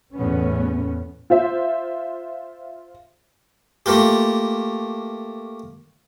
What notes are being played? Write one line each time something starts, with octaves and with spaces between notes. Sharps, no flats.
E2 A2 B3 C#4
F4 C5 E5
A3 A#3 F4 G4